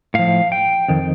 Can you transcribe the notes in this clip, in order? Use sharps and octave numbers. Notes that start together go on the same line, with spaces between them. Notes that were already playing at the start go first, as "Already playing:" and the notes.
A2 F3 F5
G5
F2 D#3